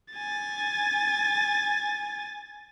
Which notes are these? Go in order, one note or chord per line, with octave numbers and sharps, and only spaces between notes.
G#5 A6